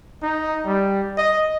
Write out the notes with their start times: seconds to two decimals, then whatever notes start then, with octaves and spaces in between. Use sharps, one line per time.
0.23 D#4
0.66 G3
1.18 D#5